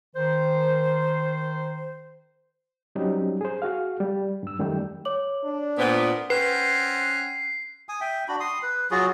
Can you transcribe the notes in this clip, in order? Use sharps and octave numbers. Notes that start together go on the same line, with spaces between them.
D#3 C5
F#3 G3 C4 C#4 D#4 G4
G#4 C5
F#4 G#4 F5
G3
G2 E6
F#2 D#3 G3 A3 G5
C#5 D6 F#7
D4
A#2 B3 C5
C4 C#4 B4 F#5 C7
G#5 D#6
E5 G5
D4 F#4 B5
C6 D#6
B4
F#3 F4 F#4 G#4